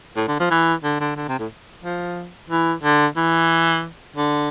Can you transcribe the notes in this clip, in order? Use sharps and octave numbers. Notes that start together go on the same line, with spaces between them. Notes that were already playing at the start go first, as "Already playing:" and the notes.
A2
D3
F3
E3
D3
D3
D3
C3
A2
F3
E3
D3
E3
D3